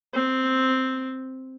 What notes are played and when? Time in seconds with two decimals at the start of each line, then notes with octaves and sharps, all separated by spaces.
0.14 C4